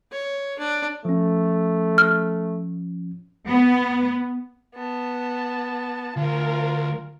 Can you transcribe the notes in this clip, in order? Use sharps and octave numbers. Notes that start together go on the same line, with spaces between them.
C#5
D4
F3 A3 C#4
F6
B3
B3 A5
D2 F4 A#4